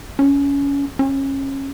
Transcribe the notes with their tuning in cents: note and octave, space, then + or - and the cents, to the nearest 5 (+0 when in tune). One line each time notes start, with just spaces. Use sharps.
C#4 +20
C#4 -25